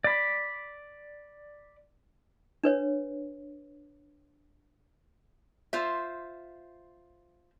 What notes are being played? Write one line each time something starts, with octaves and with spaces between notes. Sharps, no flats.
D5 B5
D4 B4 C#5
F4 C5 E5